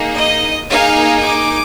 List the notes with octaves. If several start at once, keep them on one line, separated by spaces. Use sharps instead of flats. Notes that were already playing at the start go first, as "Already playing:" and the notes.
Already playing: A#3 D#4 G#4
D#5
A#3 D#4 G#4 F5
D6